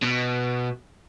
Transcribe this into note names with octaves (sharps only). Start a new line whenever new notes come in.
B2